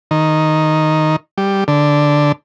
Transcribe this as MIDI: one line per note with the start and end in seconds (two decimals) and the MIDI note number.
0.11 1.16 51
1.38 1.64 55
1.68 2.32 50